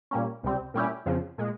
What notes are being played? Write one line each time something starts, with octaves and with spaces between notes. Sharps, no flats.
A#2 G3 A#3 C#4
C#2 C3 G3 C4
A#2 G3 C#4 E4 G4
F2 C#3 F3
A#2 G#3